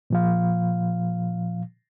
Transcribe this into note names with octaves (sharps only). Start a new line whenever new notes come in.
A#2 F3 F5